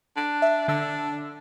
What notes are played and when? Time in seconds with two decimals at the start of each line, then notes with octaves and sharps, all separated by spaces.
0.17 D4
0.42 E5
0.68 D3 D4 E6